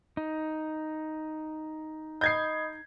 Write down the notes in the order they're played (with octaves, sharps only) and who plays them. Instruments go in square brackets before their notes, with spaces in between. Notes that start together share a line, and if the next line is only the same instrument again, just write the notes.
[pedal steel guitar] D#4
[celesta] D#5 B5 D#6 [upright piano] G6 G#6 C7